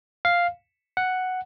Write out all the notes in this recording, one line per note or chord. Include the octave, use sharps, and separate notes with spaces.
F5
F#5